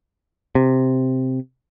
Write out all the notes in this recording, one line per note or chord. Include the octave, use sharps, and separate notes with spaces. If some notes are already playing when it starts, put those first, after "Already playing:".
C3